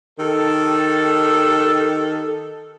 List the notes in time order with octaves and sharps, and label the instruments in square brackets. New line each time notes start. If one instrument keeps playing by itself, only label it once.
[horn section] D#3 G4 A4